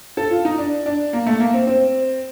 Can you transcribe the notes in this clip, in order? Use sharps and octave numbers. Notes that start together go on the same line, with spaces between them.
A4
F4
D#4
D4
D4
A#3
A3
A#3
C4
C4